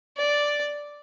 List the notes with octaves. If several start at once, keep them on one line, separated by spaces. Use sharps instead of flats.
D5